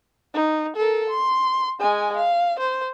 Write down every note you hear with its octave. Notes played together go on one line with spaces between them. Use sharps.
D#4
A4 A#4
C6
G#3 G#5
F5
C5